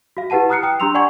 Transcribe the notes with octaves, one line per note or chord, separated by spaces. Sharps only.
F#4 F5
E4 G4 B4 F#5 A5 D#7
A#5 D#6 F6 F#6 C7 C#7
G5 D#6 C#7
D4 G4 A#5 C6 E6 F7
D5 F#5 G#5 C#6 G#6